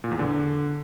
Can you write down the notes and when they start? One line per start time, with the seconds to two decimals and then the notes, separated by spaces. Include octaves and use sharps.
0.04 A#2
0.11 E2
0.19 D3